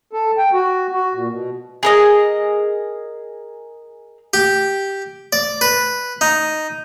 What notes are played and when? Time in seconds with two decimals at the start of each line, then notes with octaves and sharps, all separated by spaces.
0.13 A4
0.38 G5
0.53 F#4
0.92 F#4
1.14 A#2
1.29 B2
1.83 G#4 A#4 D#5
4.33 G4
5.33 D5
5.61 B4
6.21 D#4